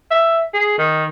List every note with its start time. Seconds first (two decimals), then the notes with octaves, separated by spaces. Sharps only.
0.11 E5
0.53 G#4
0.78 D#3